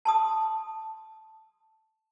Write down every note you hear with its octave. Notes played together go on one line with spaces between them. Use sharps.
A5 C6 D#6